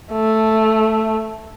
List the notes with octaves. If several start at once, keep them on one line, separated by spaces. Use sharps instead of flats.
A3